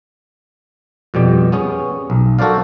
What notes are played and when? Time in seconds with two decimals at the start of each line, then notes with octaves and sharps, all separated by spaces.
1.14 F2 B2 G3 G4
1.52 B3 C#4 G#4 C#5
2.10 B1
2.39 F#4 A4 A#4 C5 D5 F5